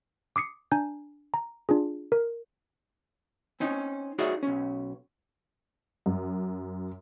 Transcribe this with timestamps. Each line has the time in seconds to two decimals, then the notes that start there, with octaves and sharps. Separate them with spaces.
0.36 D6 D#6 C7 C#7
0.72 D4 G#5 A#5 G6
1.34 A#5
1.69 D4 F4 G#4
2.12 A#4
3.60 C4 C#4 D#4
4.19 D#4 F#4 G#4 C#5 D5 E5
4.43 B1 C#4
6.06 F#2